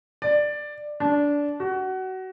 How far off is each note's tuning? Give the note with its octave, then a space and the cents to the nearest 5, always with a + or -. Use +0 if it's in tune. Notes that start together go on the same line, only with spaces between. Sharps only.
D5 +10
D4 -15
F#4 +25